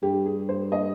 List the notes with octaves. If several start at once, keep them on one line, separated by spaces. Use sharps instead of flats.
G2 G4
G#4
C5
D#5